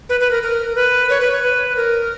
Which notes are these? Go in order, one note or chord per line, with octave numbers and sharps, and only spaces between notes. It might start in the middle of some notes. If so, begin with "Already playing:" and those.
B4
B4
A#4
A#4
B4
C#5
B4
C#5
B4
A#4